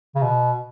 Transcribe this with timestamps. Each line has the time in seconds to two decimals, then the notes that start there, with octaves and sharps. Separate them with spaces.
0.15 C#3
0.22 B2